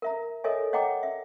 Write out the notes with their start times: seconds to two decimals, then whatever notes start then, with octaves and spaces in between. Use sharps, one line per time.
0.02 A#4 E5 A#5
0.44 A4 A#4 C#5 D#5 E5 G#5
0.73 C#5 D#5 F#5 G5 A#5 D6
1.03 E5